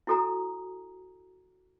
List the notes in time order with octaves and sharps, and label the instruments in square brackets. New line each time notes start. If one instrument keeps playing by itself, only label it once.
[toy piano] E4 F#4 A4 G#5 A#5 D#6